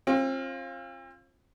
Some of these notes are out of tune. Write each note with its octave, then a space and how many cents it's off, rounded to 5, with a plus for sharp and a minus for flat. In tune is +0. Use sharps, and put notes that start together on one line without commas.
C4 +40 F4 +0